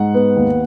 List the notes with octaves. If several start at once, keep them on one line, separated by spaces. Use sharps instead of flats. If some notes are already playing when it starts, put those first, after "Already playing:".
Already playing: G#2 F#5
B3
D#2